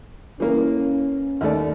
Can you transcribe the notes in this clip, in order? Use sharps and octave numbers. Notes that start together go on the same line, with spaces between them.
E3 A#3 C#4
D#2 A3 D5